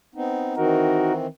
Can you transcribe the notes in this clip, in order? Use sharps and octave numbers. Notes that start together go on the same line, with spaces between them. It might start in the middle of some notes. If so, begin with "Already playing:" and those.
B3 C4 D#4
D#3 E3 C4 D#4 F#4 A#4